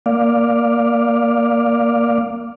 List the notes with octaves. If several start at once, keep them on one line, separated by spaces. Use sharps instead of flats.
A#3 D5 F5